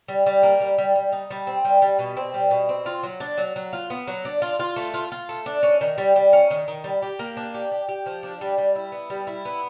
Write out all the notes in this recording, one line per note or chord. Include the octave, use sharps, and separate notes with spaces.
G3
G3
A#3
G3
G3
G3
D#4
G3
C4
G3
G3
B2
C4
G3
B2
C4
F4
F#3
D4
F#3
F#3
F4
B3
F#3
D4
F4
F4
A3
F4
F4
A3
D4
C#4
D#3
G3
G3
C#4
D#3
D#3
G3
G4
A#3
D4
G4
G4
G4
F3
D4
G3
G3
E4
B3
G3
E4
B3